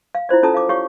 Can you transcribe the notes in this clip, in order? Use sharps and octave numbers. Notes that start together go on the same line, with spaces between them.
F5
E4 F4 C5 D5
C#4 F4 A4 A5 A#5 D#6
F5 D6
G4 C#5 F5 C#6